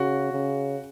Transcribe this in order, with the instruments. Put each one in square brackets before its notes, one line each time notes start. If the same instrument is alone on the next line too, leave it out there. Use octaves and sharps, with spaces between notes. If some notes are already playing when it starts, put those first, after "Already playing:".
Already playing: [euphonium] C#3 [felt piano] F#4
[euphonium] C#3